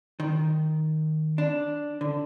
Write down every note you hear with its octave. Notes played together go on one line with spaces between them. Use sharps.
D#3
D4
D3